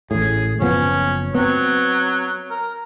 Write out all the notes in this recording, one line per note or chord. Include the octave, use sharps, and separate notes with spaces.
A1 A2 G#4
F#1 F3 B3 C#4
F#3 B3 C4
A#4